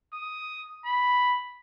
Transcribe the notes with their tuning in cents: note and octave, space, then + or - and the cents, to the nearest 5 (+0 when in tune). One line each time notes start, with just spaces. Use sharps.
D#6 +5
B5 +0